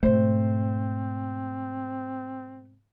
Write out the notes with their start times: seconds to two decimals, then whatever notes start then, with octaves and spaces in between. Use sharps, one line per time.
0.03 G#2 B2 A3 C4 C5